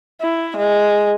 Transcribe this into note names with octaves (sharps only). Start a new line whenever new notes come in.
E4
G#3